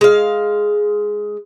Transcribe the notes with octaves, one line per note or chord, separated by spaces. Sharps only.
G#3 F5